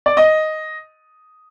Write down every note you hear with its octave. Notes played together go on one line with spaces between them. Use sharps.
D5
D#5